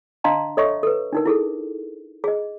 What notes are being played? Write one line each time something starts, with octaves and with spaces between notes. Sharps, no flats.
D4 D#5 F5 A5 A#5 C6
A4 C#5 D#5 E5 C#6
A4 B4
D4 D#4 A#4
E4 G#4 A4
G#4 D#5